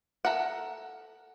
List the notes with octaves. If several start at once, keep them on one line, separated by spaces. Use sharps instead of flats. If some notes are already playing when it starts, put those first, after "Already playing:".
A4 A#4 E5 F#5